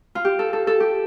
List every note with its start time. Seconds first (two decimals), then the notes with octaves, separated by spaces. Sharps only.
0.15 F4
0.25 G4
0.39 A4
0.53 A4
0.67 A4
0.80 G4